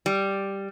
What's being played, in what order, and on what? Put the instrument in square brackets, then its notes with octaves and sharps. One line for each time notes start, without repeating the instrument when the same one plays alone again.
[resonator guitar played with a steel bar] G3